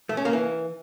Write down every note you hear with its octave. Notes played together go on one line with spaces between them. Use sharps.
A3
C#4
A#3
E3